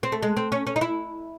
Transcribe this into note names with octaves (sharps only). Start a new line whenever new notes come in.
C4
A3
G#3
C4
C#4
C#4
D#4
E4